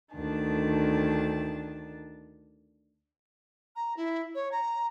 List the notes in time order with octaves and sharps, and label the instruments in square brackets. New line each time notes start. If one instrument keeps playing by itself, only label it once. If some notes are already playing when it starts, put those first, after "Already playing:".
[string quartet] D2 D#3 D4 A5
[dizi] A#5
E4
C#5
A#5